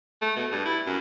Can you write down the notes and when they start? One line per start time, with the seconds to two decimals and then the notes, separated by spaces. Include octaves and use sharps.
0.22 A3
0.36 B2
0.52 G2
0.66 E4
0.87 F#2